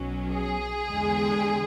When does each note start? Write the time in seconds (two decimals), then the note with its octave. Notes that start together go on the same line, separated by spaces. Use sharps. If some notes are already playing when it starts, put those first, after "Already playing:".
Already playing: B1 B2 F#3 C#4
0.32 G#4
0.87 E2 D3 G#3